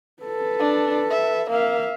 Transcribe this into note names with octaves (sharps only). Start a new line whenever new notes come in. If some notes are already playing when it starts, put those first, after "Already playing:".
A4 B4
D4
E5
A#3 E5 F5